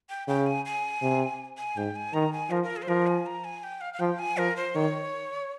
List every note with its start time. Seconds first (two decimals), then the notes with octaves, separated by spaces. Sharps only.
0.10 G5
0.28 C#3 G5
0.46 G#5
0.65 G#5
1.02 C3
1.58 G#5
1.77 G#2 G5
1.96 G#5
2.13 D#3 A#5
2.33 G#5
2.51 F3 A#4
2.63 A#4
2.76 G#4
2.82 C5
2.88 F3 A#4
3.07 G#5
3.26 A#5
3.44 G#5
3.63 G5
3.81 F5
3.94 F5
4.00 F3 G5
4.19 G#5
4.37 F3 A#4
4.56 C5
4.75 D#3 C#5